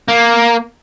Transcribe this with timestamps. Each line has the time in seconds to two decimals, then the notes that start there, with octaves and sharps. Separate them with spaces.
0.08 A#3